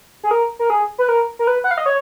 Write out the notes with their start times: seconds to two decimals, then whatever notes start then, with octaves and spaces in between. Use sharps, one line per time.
0.24 G#4
0.31 A#4
0.59 A#4
0.70 G#4
0.98 B4
1.09 A#4
1.39 A#4
1.47 B4
1.64 F#5
1.71 F5
1.78 D#5
1.86 C#5